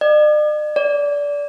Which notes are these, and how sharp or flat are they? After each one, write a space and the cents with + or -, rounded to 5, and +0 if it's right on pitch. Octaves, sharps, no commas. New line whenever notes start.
D5 +45
D5 -20